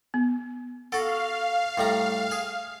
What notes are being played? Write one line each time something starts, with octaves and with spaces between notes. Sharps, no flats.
B3
F#4 A4 F5 F#5
A2 G3 A#5
G#4